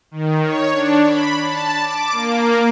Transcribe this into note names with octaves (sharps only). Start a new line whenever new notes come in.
D#3
C#5
D4
B5
A5
D6
A#3